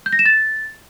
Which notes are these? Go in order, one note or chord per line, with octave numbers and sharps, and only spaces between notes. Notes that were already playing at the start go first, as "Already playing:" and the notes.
G6
A#6
E7
A6